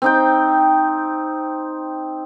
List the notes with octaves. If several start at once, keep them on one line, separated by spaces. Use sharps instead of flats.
C4 D#4 G5